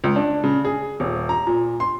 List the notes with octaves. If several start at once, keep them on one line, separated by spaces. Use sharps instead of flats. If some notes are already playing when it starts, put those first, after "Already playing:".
C#2
D4
C#3
G#4
D#1
A#5
A#2
C6